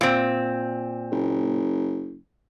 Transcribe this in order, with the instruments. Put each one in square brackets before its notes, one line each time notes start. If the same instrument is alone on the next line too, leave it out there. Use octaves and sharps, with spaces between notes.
[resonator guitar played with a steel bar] A#2 C4
[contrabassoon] F#1